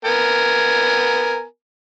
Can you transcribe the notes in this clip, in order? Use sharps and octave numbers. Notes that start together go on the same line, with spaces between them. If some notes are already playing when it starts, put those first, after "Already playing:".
B3 A#4 G#5